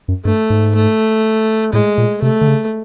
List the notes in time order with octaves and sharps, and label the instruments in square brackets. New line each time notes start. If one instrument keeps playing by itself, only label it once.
[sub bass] F#2
[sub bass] G2 [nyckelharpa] A3
[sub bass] G#2
[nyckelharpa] A3
[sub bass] A2 [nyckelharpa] G#3
[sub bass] A#2
[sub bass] C3 [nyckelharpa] A3
[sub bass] D3
C#3